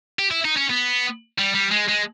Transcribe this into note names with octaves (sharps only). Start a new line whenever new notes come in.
G4
E4
D#4
C#4
B3
G3
G3
G#3
G#3